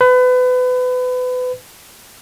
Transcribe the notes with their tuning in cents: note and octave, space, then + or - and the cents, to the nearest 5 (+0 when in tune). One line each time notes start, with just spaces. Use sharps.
B4 +30